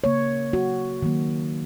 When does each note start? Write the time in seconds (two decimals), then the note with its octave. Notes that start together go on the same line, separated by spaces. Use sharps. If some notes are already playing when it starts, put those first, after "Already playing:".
0.04 C#3 A#3 C#5
0.53 F#4
1.02 D#3 F#3 A#3